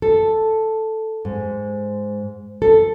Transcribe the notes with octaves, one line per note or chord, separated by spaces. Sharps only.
A4
G#2
A4